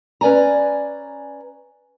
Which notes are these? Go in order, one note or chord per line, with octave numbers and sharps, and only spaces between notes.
C#4 B4 D5 G#5 A#5